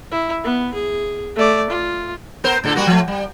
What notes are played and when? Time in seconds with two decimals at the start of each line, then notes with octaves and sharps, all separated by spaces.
0.11 E4
0.44 B3
0.74 G#4
1.36 A3 D5
1.70 F4
2.44 B3 A#4 C5
2.64 A2 D3 A4
2.75 G3 A#3 F#4
2.87 F3 A3
3.08 G3